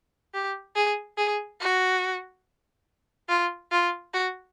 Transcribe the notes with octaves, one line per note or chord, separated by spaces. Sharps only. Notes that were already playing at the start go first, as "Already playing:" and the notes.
G4
G#4
G#4
F#4
F4
F4
F#4